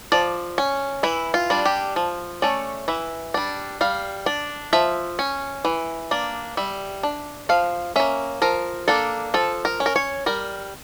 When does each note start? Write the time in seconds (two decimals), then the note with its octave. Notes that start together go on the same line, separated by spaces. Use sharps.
0.12 F3 D5
0.58 C#4
1.03 E3 E4
1.34 F4
1.50 G3 D4
1.66 G4
1.96 F3
2.42 A3 C#4 D5
2.88 E3 E5
3.34 G3 D4
3.81 G3 F5
4.26 D4
4.73 F3 E5
5.19 C#4
5.65 E3
6.11 A#3 D4
6.57 G3 E5
7.03 D4
7.49 F3 F5
7.96 A#3 C#4 E5
8.42 F3 A#4
8.88 A#3 D4 A4
9.34 F3 A4
9.65 A#4
9.80 C#4
9.86 A#4
9.96 C#5
10.26 G3 A#4